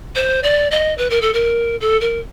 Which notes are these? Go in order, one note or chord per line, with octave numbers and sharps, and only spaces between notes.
C5
D5
D#5
B4
A#4
A4
A#4
A4
A#4